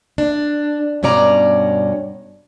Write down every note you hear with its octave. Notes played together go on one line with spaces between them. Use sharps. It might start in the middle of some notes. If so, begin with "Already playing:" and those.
D4
G2 B2 C#4 D5 A#5